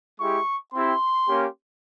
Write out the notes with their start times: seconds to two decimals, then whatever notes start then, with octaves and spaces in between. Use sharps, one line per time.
0.20 G#3 E4 G4 C#6
0.74 C4 E4 G4 C6
1.28 A#3 C#4 G4